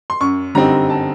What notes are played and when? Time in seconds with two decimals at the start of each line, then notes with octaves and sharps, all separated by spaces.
0.10 C6
0.21 F#2 C#6
0.55 D3 G3 C4 D#4 A#5
0.90 A5